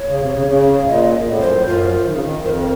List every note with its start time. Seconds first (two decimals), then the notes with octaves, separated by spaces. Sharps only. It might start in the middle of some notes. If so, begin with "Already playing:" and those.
Already playing: C#5
0.08 C#3
0.20 C3
0.33 C#3
0.48 C#3
0.83 A2
0.87 A#2 D#5
1.27 A2
1.40 F#2 C5
1.53 A2
1.66 F#2 F4
2.06 D#3
2.13 C#3
2.21 D#3
2.41 F#2
2.46 F2 A#4 C5